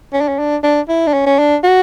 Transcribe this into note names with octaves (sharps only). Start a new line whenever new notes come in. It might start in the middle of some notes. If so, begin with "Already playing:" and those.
C#4
D4
C#4
D4
D4
E4
D4
C#4
C#4
D4
F#4